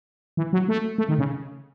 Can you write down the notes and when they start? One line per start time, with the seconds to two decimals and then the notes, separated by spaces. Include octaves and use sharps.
0.37 E3
0.53 F#3
0.68 A3
0.98 A3
1.09 D#3
1.19 C#3